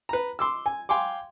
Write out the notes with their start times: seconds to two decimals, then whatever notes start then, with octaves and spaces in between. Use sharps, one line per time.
0.09 B4 A#5
0.39 C6 D6 E6
0.66 G#5
0.89 F5 G5 G#5 C6 D6